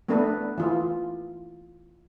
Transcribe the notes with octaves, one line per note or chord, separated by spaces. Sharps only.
A3 B3 D4 A4 B4
E3 F4